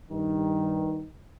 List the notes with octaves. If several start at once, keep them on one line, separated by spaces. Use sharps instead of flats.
G2 D#3